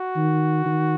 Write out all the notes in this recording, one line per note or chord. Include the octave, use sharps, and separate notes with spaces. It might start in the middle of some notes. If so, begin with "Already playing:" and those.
Already playing: F#4
D#3
D#3